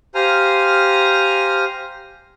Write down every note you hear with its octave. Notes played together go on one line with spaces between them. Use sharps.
G4 C5 F5 G#5 A#5 F6